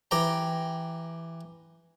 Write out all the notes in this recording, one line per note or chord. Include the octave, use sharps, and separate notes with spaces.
E3 G4 G5 A#5